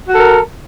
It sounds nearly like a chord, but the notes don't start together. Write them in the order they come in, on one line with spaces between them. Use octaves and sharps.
F#4 A4 A#4